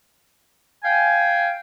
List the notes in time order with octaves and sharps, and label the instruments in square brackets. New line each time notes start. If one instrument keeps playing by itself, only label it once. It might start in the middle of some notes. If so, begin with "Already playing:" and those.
[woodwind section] F5 G5 G#5